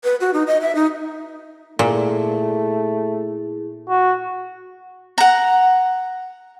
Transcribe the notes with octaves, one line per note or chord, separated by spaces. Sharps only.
B4
F#4
D#4
D#5
E5
D#4
A#2 A3 E4 G#4
F#4
F#5 A#5